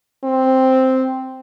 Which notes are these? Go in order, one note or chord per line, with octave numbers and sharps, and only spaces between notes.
C4